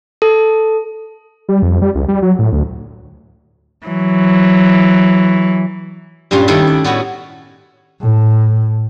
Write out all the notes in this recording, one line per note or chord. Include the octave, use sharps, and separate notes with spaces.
A4
G3
F2
G3
C#2
G3
F#3
A2
D2
E3 F#3
G2 A#2 G3 C#4 F4
D#3 G3 A3 D4 E4 A4
D5
A2 B3 C#4 F#4
A2